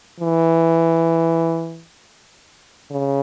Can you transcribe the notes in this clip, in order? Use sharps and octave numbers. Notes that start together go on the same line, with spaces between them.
E3
C#3